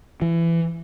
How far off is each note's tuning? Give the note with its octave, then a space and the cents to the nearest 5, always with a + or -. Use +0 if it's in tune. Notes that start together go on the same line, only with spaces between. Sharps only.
E3 +25